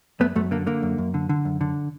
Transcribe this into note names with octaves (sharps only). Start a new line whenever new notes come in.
F#2 A3 B3
F#2 A3
D3 A#3
D3 A#3
F#2
F#2
D3
D3
F#2
D3